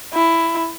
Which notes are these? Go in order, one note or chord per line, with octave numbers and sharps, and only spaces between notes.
E4